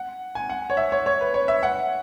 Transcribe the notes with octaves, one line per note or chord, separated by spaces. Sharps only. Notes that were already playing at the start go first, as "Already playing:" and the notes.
Already playing: F#5
G#5
F#5
C#5
E5
C#5
C#5
B4
C#5
E5
F#5